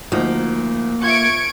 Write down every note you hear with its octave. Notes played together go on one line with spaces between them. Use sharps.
D2 F3 A#3 D#4
F4 E5 C#6 G#6 D7